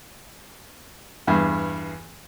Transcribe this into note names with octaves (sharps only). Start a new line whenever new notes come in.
E2 G2